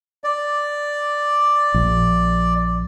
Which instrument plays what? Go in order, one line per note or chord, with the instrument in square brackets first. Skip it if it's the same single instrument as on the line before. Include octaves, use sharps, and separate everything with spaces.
[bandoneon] D5
[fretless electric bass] A#1